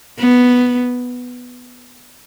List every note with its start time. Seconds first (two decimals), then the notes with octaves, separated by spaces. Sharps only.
0.19 B3